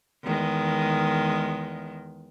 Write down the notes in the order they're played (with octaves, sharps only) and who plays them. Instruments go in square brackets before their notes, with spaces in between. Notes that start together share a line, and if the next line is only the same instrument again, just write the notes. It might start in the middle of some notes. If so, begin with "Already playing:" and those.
[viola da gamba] E2 D#3 G#3